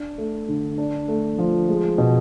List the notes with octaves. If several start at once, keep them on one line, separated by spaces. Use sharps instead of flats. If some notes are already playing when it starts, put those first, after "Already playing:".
Already playing: D4
A3
D3
D4
A3
F3
G#3
B2